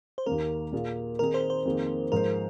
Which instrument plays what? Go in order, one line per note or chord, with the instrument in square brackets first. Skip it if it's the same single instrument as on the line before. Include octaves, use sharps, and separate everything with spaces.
[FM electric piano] C5
[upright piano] D#2 D#3 A#3 [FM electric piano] A#4
[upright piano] A#2 A#3 F4 G#4
[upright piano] D#3 C4 D#4 G#4 [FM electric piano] A#4
[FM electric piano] C5
C5
[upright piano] F2 D#3 A#3 G#4
[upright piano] G#2 F3 G#3 F4 C5 [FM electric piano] A#4